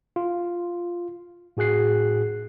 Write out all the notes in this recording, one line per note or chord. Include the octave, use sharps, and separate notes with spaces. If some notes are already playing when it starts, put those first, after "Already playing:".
F4
A2 F#4 G#4 F#6 C7